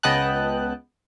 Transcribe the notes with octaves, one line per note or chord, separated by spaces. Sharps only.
C#2 B3 D#5 G5 A5 F#6